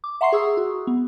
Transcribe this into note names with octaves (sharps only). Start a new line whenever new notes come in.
D6
E5 F#5 A#5 C6 C#6 C7
G#4 C#6 D#6 E6
F#4
B3